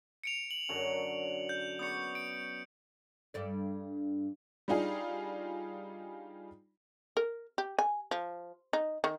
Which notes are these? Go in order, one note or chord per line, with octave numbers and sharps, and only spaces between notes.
C#7 D7 F7
F#7
F#2 D3 F#3
G6
B3 D5 C#6 D#6 C#7
D7
G2 A4 D5
G3 D4 D#4 F4 G#4
A#4
G4
G#5
F3
D#4
D#3